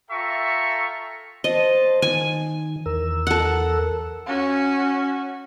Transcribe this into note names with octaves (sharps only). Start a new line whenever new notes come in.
F4 A4 E5 G5 A#5 C#6
C5 D#5 A5
D#3 G#5
E2 A#4 E6
A4 F#5
C#4 F#4